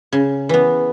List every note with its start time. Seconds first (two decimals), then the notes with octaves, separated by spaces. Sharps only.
0.12 C#3
0.49 E3 B3